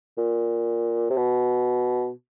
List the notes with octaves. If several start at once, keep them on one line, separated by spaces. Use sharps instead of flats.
A#2
C3
B2